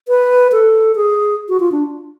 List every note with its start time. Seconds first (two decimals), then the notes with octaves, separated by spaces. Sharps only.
0.08 B4
0.52 A4
0.96 G#4
1.49 F#4
1.60 F4
1.72 D4